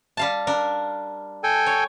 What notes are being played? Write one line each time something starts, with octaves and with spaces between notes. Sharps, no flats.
G3 F5 A5
D4 A#4
A4 G5 G#5
C#5